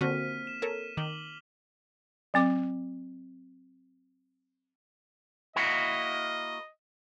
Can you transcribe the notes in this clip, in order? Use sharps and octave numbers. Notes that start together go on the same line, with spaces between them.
D3 A#3 C4 F#4 F6 B6 D#7
E7
A4 A#4 C#5
D#3 D6 F#7 G7
F#3 C4 D6
A#3 E4 F#4 D#5